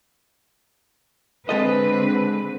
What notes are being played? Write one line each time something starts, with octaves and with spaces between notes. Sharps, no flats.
D3 G#3 C4 A4 B4 D#5